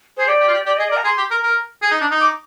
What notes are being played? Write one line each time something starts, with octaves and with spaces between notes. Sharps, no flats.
G#4 C5
G4 D5
G4
F4
G4
G4 D5
G#4 D#5
A#4 D5
A#5
G#4 C6
G4
A#4
A#4
G#4
D#4
D4
D#4
D6